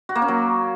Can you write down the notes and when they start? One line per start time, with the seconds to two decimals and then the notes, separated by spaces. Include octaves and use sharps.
0.09 F#4
0.15 A#3
0.22 C#4
0.28 F#3